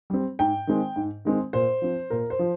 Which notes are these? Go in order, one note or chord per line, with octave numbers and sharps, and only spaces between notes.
G3 C4
G#2 G5
D#3 G#3 C4
G#2
D#3 G#3 C4
A#2 C5
F3 C4
A#2 A#4
C5
F3